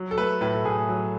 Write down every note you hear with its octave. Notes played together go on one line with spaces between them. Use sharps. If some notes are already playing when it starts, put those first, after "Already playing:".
Already playing: F#3
A4
A3 B4
A2 B4
A4
A2 G#4
F#3